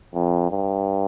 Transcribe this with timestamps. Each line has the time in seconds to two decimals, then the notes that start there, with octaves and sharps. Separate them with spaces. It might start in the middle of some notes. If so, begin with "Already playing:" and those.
0.14 F2
0.51 G2